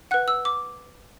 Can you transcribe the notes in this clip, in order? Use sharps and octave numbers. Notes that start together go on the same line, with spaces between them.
B4 F#5 F#6
E6
D6